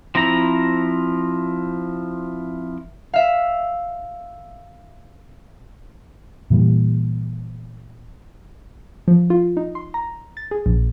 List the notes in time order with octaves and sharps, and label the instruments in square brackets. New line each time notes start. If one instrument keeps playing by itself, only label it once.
[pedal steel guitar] F3 C4 E4 A#5
[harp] E5 F5
[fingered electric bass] A#2 E3 G3
[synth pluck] F3
F4
D#4
C6
A#5
A6
G#4
A#1